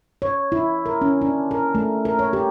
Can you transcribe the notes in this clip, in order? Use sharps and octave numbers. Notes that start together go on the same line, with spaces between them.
C#5
E4
A#4
C#4
D4
A#4
A3
A#4
C#5
G4